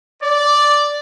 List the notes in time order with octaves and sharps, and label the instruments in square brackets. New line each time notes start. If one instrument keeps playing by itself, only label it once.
[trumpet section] D5